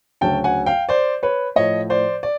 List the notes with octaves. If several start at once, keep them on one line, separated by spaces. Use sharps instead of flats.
D2 C#3 F#3 G5 A5
F#5 G#5
F5 G5
C5 D5
B4 C#5
A2 F3 C#5 D#5
C5 D5
D5